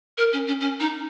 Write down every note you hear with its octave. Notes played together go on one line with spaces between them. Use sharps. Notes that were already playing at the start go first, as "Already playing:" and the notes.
A#4
C#4
C#4
C#4
D#4